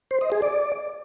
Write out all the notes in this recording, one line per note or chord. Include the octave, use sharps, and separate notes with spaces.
C5
D#5
G#4
D5